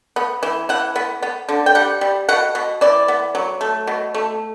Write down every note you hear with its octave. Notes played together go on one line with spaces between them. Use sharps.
B3
E3
E3 F#5
B3
B3
D3
G5
G3 F#5
G3
B2 F#5
B2
E3 D5
B3
F#3
A3
B2
A3